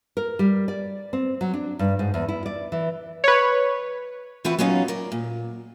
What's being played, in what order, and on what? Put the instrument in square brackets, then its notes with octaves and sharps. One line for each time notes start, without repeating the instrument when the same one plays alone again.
[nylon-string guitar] A#4
G3
D5
C4
F#3
D4
G2
G#2
E2
E4
D5
E3
[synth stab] B4 C#5
[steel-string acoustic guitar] E3 C4 F4 F#4 B4 F#5
F#3 A#3 B3 C#4 D#4 F4
A#4 D5
A#2